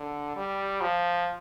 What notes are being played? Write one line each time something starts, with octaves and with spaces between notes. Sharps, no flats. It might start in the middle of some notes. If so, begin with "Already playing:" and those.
Already playing: D3
G3
F3